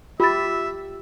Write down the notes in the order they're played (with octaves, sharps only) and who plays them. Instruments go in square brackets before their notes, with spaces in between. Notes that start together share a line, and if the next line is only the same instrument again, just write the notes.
[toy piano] F4 [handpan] G4 [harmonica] E5 [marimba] B5 A6